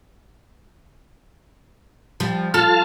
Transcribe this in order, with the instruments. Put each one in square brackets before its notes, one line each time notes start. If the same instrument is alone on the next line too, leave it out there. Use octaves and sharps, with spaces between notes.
[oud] F3 G3
[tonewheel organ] F4 A5 F6 [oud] A4